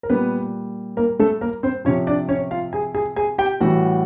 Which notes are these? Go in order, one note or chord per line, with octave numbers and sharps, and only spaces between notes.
A#4
A#2 G3 B3 B4
A#3 A#4
A3 A4
A#3 A#4
C4 C5
C3 F3 C#4 C#5
D4 D5
C#4 C#5
F4 F5
G#4 G#5
G#4 G#5
G#4 G#5
G4 G5
A2 E3 G3 F#4 F#5